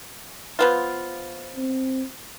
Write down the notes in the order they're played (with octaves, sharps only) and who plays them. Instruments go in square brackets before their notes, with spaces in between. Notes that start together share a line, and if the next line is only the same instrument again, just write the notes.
[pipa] F3 B3 F4
[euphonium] C4